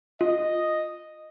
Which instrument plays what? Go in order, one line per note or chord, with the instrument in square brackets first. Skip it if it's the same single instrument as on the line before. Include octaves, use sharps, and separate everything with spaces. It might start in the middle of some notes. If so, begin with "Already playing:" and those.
[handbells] F4 [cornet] D#5